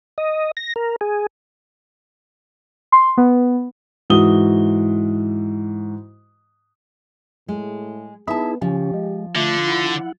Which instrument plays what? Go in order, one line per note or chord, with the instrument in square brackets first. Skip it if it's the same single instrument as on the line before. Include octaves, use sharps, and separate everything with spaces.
[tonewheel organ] D#5
A#6
A#4
G#4
[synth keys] C6
B3
[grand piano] G#2 E3 F#4 D#6 G7
[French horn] A2 [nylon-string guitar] G#3
[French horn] B3 [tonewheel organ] D#4 E4 G#4 [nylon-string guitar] E5 A5
[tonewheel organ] C#3 C#4 [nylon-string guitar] F3 [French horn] G4
[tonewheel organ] G#3
[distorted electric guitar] D3 [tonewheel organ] A3 [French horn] F4
[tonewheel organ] E4 F#5